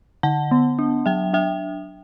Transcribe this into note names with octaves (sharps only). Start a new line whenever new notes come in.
D3 F#5 A5
B3
D4
F#3 E5 G5
D4 E5 G5